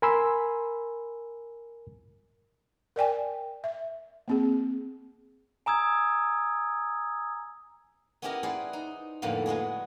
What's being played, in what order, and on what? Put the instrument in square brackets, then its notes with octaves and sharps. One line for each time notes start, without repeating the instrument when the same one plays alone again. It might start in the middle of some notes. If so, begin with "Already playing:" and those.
[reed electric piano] A#4 G#5 B5 C6 E6
[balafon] A#4 D5 G5 G#5
E5
A#3 C4 G#4
[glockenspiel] G#5 A#5 D#6 E6 G#6
[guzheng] B3 C#4 E4 G4 A#4 D#5
G#4 B4 C5 D5 F#5
D#4
F2 A2 D3 A#3 B3
G#3 B3 F#4 G#4